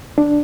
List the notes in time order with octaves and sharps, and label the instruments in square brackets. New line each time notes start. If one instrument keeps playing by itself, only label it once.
[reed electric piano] D4